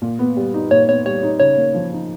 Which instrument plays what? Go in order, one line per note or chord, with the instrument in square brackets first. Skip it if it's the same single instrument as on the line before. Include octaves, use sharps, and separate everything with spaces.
[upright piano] A#2
B3
G3
D#4
[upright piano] A#2 [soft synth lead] C#5
[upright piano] B3 [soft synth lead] C#5
[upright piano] G3 [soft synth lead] C#5
[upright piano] D#4
[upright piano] C#3 [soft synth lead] C#5
[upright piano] A#3
F3
D#4